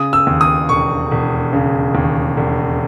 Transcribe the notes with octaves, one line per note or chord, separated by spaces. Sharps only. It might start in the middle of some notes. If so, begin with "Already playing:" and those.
Already playing: C#3 D#6
E6
D#2
D#6
E1 C#6
E1
C#3
D#2
E1